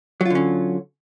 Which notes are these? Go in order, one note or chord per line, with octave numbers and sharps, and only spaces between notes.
D3 F#3 C#4 F4